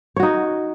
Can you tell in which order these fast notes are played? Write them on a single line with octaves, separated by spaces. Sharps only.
C#5 F#4 D#4